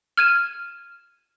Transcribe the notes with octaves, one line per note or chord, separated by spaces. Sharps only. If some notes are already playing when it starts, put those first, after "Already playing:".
F6 G#6 D#7 E7